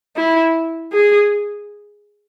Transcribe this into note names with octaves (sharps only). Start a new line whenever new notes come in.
E4
G#4